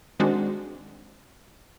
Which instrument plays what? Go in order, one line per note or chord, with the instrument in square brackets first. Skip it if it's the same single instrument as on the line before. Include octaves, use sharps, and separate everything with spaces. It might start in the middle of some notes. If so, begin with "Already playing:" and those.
[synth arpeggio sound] D#3 G#3 C4 D4 F#4